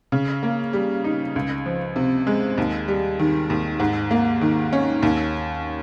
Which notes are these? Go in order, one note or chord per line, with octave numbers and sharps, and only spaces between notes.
C#3
A#3
G3
D#4
C#2
F3
C3
G#3
D#2
G3
D#3
D#2
G#2
A#3
D#3
C#4
D#2